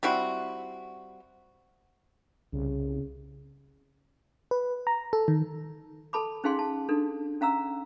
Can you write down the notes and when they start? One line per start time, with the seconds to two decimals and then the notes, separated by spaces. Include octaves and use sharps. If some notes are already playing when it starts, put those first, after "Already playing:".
0.03 G3 C4 E4 F#4
2.53 C2 C#3
4.51 B4
4.87 A#5
5.13 A4
5.28 D#3
6.13 A4 A5 B5 D6
6.44 C#4 D#4 G#4 F5 G#5 C6
6.59 A5
6.89 D4 D#4 A4
7.41 C#4 F5 A#5 E6